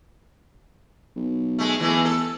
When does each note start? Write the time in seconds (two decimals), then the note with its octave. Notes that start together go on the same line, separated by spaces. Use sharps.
1.16 B1
1.59 G#3 A3
1.80 E2 E3 G#3 A3
2.05 A4